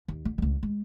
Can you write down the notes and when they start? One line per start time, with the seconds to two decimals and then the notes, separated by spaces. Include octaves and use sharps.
0.08 D#2
0.25 D3
0.38 C#2 D3
0.63 G#3